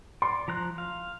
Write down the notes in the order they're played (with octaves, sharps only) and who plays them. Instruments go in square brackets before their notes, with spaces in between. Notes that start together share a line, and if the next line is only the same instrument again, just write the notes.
[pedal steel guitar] D5 [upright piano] C6
[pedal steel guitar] F3 A#5 F#6
F5